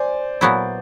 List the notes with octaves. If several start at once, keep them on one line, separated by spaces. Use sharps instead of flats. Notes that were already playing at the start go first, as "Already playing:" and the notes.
Already playing: C5 D5 G#5
A#2 F#3 B3 E4